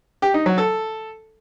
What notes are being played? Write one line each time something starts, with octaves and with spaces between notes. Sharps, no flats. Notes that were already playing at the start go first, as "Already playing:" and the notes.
G4
D#4
F#3
A4